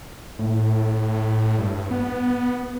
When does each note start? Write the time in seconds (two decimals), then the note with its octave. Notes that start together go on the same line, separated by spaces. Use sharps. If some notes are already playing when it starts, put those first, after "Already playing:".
0.39 A2
1.58 G2
1.91 B3